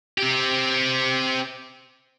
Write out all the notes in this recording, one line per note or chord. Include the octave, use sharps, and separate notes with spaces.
C4 G4